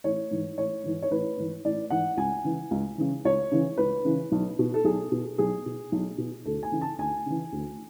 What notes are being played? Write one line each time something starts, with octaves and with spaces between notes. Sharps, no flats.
A1 C#5
G#2 E3
A1 C#5
G#2 E3
C#5
A1 B4
G#2 E3
A1 D5
G#2 E3 F#5
C#2 G#5
C#3 E3
C#2
C#3 E3
C#2 C#5
C#3 E3
C#2 B4
C#3 E3
B1
B2
A4
B1 G#4
B2
B1 G#4
B2
B1
B2
D2 A4
G#5
C#3 E3
A5
D2 G#5
C#3 E3
D2